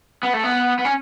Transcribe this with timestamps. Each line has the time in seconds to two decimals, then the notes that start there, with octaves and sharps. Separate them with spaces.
0.23 B3
0.34 A3
0.44 B3
0.79 B3
0.85 C#4